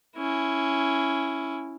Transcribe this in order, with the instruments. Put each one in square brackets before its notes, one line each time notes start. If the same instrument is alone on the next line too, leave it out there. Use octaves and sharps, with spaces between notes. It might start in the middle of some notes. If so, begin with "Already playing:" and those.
[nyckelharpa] C#4 E4